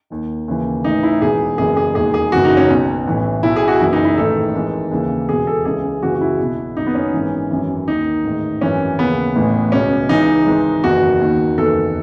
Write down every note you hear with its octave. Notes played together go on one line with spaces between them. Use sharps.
D#2 D#3
D#2 C#3 E3
A1 A2 E3 D#4
E4
E1 E2 B2 G#4
F#1 F#2 E3 G#4
G#4
E1 D#2 D#3 G#4
G#4
F#1 F#2 C#3 E3 F#4
D#4
C#4
B1 B2
A1 A2 E3
B1 B2 E4
G#4
F#4
F#1 F#2 E3 E4
D#4
E4
A1 G#2 D#3 A4
G#1 G#2 E3
D#2 C#3 E3
E1 E2 B2 G#4
A4
C#2 C#3 E3 G#4
F#1 F#2 C#3 E3 F#4
F#4
E4
B1 B2
F#1 F#2 D#3 D#4
B3
C#4
G#1 G#2 E3
G#1 F#2 E3
D#2 D#3 D#4
A1 G#2 D#3
G#1 F#2 E3 C#4
D#2 C#3 E3 B3
A1 A2 E3
C#2 B2 C#4
C#2 C#3 E3 D#4
G#1 G#2 E3
F#1 E2 D#3 F#4
D#2 D#3
F#1 E2 D#3 A4